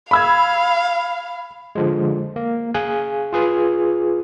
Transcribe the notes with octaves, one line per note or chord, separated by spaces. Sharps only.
F5 B5 E6 G#6
D3 F3 G#3
A#3
G#4 F5 G#5 F#6
F4 G#4 B4